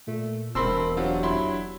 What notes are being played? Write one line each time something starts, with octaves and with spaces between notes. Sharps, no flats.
A#2 A3
E1 C4 A#4 A5 B5 C6 E6
F#3 C4 D4 F4 G4 F#5
E4 B5 C6